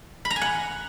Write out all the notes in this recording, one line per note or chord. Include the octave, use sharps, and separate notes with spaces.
B5
A#5
G#5
F#5